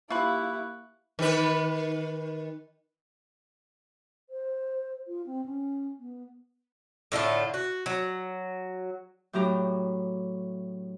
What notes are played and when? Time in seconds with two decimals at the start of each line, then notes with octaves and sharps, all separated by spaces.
0.10 A#3 E4 F4 G4 B5 C#6 F#6
1.19 D#3 B4
4.30 C5
5.08 F4
5.26 C4
5.46 C#4
5.99 B3
7.12 A2 D3 A3 F4
7.54 F#4
7.86 F#3
9.33 A2 F#3 D4 G4 A#5